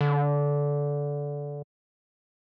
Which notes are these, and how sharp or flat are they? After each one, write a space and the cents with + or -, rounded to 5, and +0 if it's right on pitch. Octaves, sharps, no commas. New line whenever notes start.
D3 -20